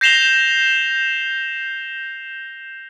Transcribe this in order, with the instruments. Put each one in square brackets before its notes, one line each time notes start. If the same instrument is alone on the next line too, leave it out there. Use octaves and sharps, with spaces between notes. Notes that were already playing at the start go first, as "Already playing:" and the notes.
[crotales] G6 A#6 C7 E7 F7 G7